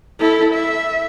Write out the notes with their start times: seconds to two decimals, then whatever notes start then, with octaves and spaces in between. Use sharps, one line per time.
0.19 E4 A4
0.54 E5